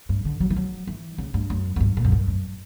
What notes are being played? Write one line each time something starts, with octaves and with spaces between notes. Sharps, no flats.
G2
D3
F#3
E3
F#3
E3
C#3
G2
F#2
F#2
G2
A#2
F#2
G2
F#2